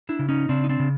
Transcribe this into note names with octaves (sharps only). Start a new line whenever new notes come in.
D4 E4
C#3
C#4 D#4
C#3 C4 D4
D#4
C4 D4
C#3